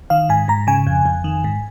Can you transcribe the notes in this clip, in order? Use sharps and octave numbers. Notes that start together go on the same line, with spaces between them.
D#3 F5
G#2 G#5
G#2 A#5
C#3 G#5
F2
F2
D#3
G#2